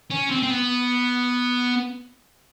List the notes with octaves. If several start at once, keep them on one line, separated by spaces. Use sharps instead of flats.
C#4
C4
C4
B3